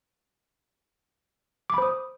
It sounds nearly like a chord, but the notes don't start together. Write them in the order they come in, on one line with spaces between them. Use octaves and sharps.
D6 B5 C5 D#6